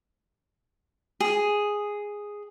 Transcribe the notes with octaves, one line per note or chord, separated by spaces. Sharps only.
G#4